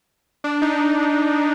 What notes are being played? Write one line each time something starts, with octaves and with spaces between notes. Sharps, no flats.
D4
D#4